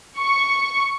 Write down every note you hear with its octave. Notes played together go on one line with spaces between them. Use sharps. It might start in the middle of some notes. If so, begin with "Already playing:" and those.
C#6